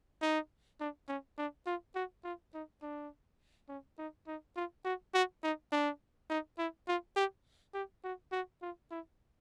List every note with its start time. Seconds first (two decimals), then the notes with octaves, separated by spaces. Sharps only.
0.22 D#4
0.80 D4
1.08 C#4
1.38 D4
1.66 F4
1.95 F#4
2.24 F4
2.54 D#4
2.82 D4
3.68 C#4
3.98 D#4
4.27 D#4
4.56 F4
4.85 F#4
5.14 F#4
5.43 D#4
5.72 D4
6.30 D#4
6.58 E4
6.88 F4
7.16 G4
7.74 G4
8.04 F#4
8.32 F#4
8.62 F4
8.91 E4